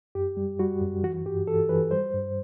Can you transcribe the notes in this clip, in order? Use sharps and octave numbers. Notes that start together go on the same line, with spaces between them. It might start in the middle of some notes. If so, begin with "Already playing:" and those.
F#2 G4
G3
G3 F#4
F#2
E3 F#4
G2 G4
E3 A4
E3 B4
G3 C5
G2